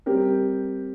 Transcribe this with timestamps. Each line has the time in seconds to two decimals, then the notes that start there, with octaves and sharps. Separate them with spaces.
0.06 G3 C4 G4 A#4